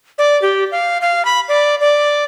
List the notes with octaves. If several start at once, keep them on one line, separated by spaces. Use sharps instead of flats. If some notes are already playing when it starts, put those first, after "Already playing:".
D5
G4
F5
F5
B5
D5
D5